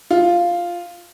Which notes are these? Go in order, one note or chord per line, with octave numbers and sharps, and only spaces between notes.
F4